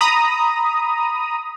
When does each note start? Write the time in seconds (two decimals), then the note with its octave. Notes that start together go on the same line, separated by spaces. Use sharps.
0.01 A#5 B5 D#6